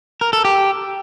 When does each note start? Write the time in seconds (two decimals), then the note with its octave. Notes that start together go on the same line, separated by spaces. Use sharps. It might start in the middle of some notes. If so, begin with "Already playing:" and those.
0.21 A#4
0.33 A4
0.45 G4